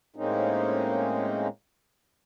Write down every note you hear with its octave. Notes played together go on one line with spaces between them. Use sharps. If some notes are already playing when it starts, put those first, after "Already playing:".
A2 G#3 A#3 C4 C#4 D#4